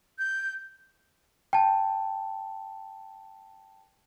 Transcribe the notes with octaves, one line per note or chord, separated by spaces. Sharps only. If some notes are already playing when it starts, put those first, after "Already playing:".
G6
G5 A5